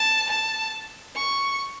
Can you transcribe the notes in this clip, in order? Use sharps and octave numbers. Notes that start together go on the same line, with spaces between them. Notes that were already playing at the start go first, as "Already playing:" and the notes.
Already playing: A5
A5
C#6